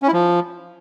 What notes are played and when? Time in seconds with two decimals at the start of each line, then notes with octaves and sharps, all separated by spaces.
0.02 C#4
0.08 E4
0.13 F3